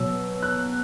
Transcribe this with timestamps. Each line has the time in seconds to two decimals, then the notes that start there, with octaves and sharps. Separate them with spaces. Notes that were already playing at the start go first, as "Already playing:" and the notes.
Already playing: B2 F#3 E6
0.42 F#6